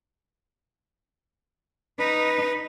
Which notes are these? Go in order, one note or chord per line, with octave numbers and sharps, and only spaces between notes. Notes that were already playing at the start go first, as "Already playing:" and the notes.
D#4 B4